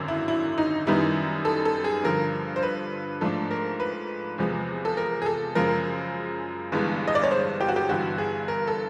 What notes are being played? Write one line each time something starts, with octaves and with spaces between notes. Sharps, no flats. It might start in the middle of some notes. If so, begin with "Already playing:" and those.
Already playing: G#1 F#2 D3 F#3
E4
E4
D#4
F#2 D#3 G3 B3 D#4 E4
A4
A4
G#4
G2 D3 F3 A#4
C5
B4
G#2 F3 A3 D4 A4
A#4
B4
E2 C3 F3 G#3 B3
A4
A#4
G#4
A4
F#2 C#3 F3 G#3 A#4
G1 G2 E3 G#3 B3
D#5
D5
C#5
C5
G4
F#4
G4
G1 G2 E3 F#4
G#4
A#4
A4